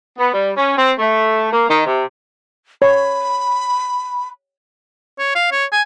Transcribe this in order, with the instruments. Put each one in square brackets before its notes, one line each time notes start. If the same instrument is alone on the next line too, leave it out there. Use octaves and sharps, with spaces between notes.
[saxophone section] B3
G3
C#4
C4
A3
A#3
D#3
C3
[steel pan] C#5 [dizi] B5
[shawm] C#5
F5
C#5
G#5